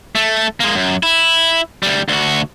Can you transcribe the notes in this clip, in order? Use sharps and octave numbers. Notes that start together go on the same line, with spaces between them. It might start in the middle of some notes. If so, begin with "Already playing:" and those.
A3
G#3 A#3
F#2
E4
D2 G3
D2 F#4